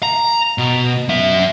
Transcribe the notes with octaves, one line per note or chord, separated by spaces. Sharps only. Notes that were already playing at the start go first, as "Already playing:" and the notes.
A#5
B2
F#2 E5